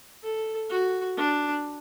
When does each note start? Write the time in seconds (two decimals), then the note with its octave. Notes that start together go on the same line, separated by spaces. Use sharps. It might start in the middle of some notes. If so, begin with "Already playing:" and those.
0.23 A4
0.70 F#4
1.17 D4